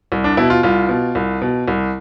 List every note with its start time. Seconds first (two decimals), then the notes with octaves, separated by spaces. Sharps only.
0.12 C2
0.24 D4
0.37 B2 E4
0.50 F4
0.63 C2 F4
0.89 B2
1.15 C2
1.41 B2
1.68 C2